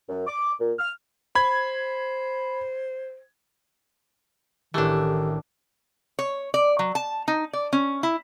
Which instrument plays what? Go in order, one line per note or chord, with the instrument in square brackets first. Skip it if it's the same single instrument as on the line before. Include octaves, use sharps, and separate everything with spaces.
[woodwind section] F#2
D6
A#2
F6
[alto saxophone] C5 [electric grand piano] B5 G#6
[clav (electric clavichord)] A1 E3 [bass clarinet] D#3 [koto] A3 D4 [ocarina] G4
[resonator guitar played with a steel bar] C#5
D5
F#3
A5
D#4
D5
C#4
E4